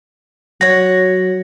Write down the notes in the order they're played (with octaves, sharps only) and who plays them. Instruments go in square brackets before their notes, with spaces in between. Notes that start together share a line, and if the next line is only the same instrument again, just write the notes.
[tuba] F#3 [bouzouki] C#5 F#5 [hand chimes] A#6